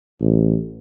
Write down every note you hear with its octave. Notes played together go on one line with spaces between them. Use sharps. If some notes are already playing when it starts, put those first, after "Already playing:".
A1